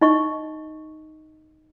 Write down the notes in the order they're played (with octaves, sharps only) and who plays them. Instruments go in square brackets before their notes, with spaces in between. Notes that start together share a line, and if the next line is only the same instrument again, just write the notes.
[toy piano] D#4 D#5 C#6